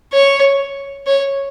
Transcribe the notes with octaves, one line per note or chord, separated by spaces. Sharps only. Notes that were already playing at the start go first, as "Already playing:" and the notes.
C#5
C#5